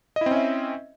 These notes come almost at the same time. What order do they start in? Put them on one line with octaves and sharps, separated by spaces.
D#5 E4 C4 C#4 E5